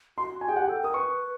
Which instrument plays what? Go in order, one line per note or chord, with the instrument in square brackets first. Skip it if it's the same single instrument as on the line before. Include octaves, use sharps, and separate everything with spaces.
[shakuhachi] F#4 [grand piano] C6
[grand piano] G#5
[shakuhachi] G#4 [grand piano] G5
[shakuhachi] G4 [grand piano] F#5
[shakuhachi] A4 [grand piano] G5
[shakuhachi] A#4 [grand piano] D#6
[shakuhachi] B4 [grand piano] C#6